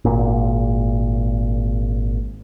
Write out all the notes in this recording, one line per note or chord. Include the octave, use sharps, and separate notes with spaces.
G#1 A#2